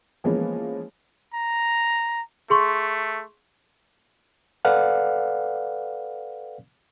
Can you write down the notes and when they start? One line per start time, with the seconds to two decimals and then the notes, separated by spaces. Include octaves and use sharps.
0.24 E3 F3 G#3 A#3 B3 C#4
1.34 A#5
2.50 A3 G#4 C6 C#6
4.65 A4 B4 D5 F5 F#5